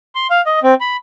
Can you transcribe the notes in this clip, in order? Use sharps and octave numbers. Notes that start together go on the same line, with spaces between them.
C6
F5
D#5
C4
B5